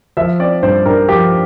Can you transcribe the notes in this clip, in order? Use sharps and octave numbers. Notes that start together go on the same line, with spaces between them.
F3 E5
C4 D5
G2 C5
G2 A#4
F3 G4